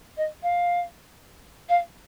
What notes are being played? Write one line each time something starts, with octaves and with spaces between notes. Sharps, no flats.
D#5
F5
F5